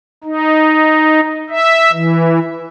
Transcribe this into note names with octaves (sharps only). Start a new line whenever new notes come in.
D#4
E5
E3